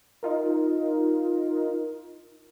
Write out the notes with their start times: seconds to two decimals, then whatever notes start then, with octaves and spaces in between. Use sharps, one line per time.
0.23 D#4 F4 A#4